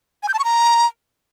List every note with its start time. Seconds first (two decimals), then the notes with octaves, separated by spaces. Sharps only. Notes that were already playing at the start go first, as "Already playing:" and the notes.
0.23 G#5
0.28 G6
0.34 A5
0.39 C#6
0.44 A#5